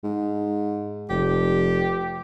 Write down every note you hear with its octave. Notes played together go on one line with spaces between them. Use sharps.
G#2
F1 G4